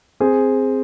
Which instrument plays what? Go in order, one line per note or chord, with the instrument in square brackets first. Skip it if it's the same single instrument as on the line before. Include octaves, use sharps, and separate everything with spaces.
[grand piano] C4 G#4